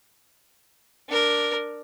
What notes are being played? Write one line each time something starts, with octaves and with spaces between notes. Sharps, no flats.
D4 A#4